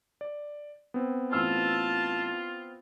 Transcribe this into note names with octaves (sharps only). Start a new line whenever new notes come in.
D5
B3 C4
A1 F4 A5 E6 F6